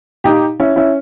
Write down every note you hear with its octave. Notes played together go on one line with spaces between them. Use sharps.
A#2 D#4 G4
C#4 E4
C#4 E4